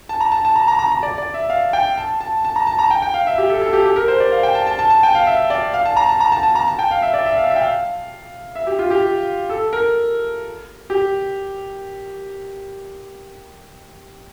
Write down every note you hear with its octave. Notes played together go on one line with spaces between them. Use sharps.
A5
A#5
A5
A5
A#5
A#5
A#5
A#5
D5
D5
E5
F5
G5
A5
A5
A5
A#5
A5
A#5
G5
G5
F5
E5
G4
A4
A4
G4
G4
A#4
C5
D5
F5
G5
A5
A5
A5
A5
G5
F5
E5
D5
F5
A5
A#5
A5
A#5
A5
A5
A#5
A5
G5
F5
E5
D5
E5
F5
E5
G5
F5
E5
G4
F4
G4
A4
A#4
G4